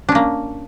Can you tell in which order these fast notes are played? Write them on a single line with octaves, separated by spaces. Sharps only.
D4 C#4 A#3